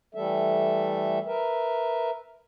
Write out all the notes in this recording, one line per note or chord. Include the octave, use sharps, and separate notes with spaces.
E3 G3 A3 A4 E5
A#4 B4 E5